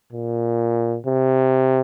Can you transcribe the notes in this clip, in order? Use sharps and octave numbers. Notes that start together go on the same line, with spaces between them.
A#2
C3